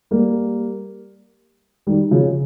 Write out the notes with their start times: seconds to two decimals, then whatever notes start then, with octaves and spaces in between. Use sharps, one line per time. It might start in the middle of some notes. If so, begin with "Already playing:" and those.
0.11 G3 A#3
1.87 D#3 G3
2.11 C#3 F3